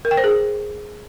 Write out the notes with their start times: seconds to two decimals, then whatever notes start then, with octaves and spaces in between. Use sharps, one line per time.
0.05 A#4
0.11 G5
0.17 C5
0.24 G#4